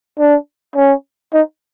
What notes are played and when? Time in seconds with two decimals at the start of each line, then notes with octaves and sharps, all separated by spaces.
0.19 D4
0.76 C#4
1.33 D#4